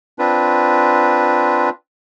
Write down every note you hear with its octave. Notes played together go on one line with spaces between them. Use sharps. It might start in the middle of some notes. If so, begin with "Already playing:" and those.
C4 D4 F4 B4